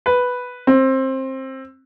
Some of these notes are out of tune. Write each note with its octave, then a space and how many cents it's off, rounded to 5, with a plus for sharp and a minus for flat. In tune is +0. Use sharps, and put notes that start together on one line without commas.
B4 +0
C4 +20